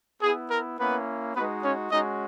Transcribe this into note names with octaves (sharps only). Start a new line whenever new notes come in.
B3 E4 G#4
A#4
A#3 B3 C#4 E4 B4
G#3 B3 D#4 F#4 B4
C#4 C#5
G#3 C#4 D#4 F#4 D#5